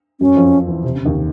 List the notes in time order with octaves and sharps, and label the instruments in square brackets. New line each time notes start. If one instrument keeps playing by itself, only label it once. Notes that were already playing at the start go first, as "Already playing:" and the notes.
[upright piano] F#2 F#3 [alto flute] C#4
[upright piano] F2 F3
E2 E3
C3
C#3
D#2 D#3
D#3